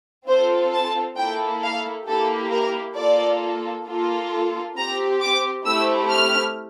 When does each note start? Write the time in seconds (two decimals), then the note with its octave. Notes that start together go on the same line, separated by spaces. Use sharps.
0.28 C4 F4 A4 C5
0.73 A5
1.18 A#3 E4 A4 G5
1.63 F5
2.08 A#3 E4 G4 A4
2.52 A#4
2.97 A#3 F4 A4 D5
3.87 A#3 F4 A4
4.77 C4 G4 A#5
5.22 D6
5.66 A3 C4 E4 G4 E6
6.12 F6